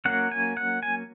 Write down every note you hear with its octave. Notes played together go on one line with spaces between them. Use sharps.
F#3 A#3 C#4 F#5
G#5
F#5
G#5